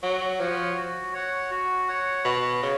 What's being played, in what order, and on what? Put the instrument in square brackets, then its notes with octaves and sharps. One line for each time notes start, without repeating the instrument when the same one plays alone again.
[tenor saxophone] F#3 [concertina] F#4
[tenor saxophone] F3 [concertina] C#5 F#5
[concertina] F#4
C#5 F#5
F#4
C#5 F#5
[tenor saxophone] B2 [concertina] F#4
[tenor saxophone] C#3 [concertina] C#5